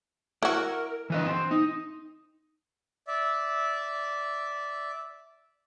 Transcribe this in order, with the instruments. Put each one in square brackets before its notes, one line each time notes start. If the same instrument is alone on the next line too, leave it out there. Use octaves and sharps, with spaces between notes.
[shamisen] E4 F#4 [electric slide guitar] A#4
[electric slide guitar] E3 B4 D#5
C4
D#4
[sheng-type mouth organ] D5 E5